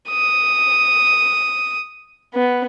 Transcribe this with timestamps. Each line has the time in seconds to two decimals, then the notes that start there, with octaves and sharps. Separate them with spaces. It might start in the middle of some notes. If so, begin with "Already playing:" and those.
0.10 D#6
2.34 B3